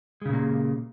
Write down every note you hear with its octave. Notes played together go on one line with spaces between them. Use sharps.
A#2 C#3 G#3 A#3